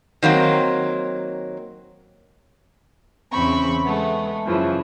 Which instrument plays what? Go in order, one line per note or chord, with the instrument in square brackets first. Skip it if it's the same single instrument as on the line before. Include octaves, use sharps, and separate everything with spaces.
[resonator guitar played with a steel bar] D#3 F#3 A#3 C4
[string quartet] E2 C#3 C4 B5 C#6
G#3 A3 B3
F#2 C#3 E3 F3